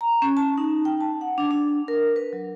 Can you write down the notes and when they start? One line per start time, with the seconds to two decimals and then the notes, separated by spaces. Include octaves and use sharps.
0.01 A#5
0.22 C#4
0.37 A5
0.58 D#4
0.85 G5
1.01 A5
1.21 F#5
1.38 D4
1.51 D4
1.88 A#4
2.16 B4
2.33 F#3